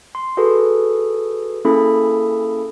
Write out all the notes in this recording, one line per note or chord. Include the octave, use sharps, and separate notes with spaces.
C6
F#4 G#4 A4 B4
A#3 C#4 E4 G#4 A4 B5